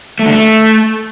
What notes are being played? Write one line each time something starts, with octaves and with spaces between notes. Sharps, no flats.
A3
D3
A3